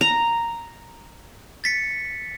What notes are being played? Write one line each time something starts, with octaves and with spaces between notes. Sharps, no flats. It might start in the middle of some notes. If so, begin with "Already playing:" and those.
A#5
A6 B6 C#7